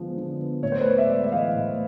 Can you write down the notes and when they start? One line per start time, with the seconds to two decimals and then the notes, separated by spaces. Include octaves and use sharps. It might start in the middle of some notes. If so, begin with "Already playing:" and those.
Already playing: D3 F3 G#3 B3
0.17 D3
0.41 B3
0.62 A2 C#5
0.72 C5
0.81 B4 C#5
0.86 B3
0.97 D5 E5
1.10 G#3
1.24 E5
1.32 E3 D#5 F5
1.55 A2